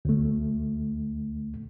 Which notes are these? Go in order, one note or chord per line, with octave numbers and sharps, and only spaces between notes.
D2 A3